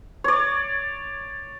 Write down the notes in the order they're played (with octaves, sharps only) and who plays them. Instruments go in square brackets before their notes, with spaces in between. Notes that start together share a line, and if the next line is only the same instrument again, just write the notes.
[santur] C#5 D5